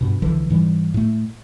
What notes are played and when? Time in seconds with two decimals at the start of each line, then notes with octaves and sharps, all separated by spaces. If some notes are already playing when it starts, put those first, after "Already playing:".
0.01 G2 B2
0.22 C2 D3 E3 F3
0.50 G#2 E3 G3
0.94 A2 A3